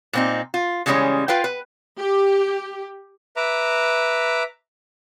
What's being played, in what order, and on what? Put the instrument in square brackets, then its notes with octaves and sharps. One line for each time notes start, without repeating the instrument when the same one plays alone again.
[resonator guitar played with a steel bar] A#2 C4 D#4
F4
C#3 E3 G3 G#3 C4 C#4
F4 B4 F5 G5
B4
[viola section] G4
[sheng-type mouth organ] B4 E5 A#5 D6